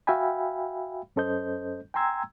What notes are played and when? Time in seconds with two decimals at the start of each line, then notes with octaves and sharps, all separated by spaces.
0.07 F#4 E5 F5 G5 G#5 B5
1.16 F#2 C#4 A4 C5 D#5 G6
1.94 G5 G#5 A#5 C6 E6 G#6